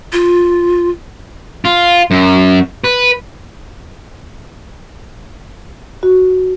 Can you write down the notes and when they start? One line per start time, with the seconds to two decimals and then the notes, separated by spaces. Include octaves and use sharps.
0.13 F4
1.65 F4
2.11 F#2
2.84 B4
6.03 F#4